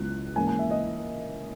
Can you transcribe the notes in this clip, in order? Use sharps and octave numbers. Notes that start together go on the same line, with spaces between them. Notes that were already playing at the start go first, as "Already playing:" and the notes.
Already playing: C#2 C#3 F#3 B3 E4 F#6
G#2 E3 A#3 C#4 G#5
G#5
E5
D#5